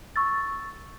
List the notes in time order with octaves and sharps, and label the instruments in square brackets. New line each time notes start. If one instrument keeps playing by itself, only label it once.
[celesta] C#6 E6 A6